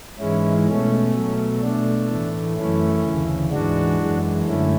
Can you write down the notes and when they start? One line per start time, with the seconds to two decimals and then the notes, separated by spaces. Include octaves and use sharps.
0.19 G#2 E3 G#3 C#4 E4
0.67 B2 A3 C#4
1.14 B2 F#3 A3
1.62 B2 A3 D4
2.09 A2 E3 A3
2.57 F#2 E3 A3 C#4 E4
3.04 D2 C#3 E3
3.52 G#2 E3 G#3 D4 F#4
4.00 F#2 E3 G#3
4.47 F#2 D3 A3 C#4 E4